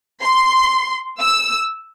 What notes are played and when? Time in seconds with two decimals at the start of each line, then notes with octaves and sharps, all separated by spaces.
0.22 C6
1.20 E6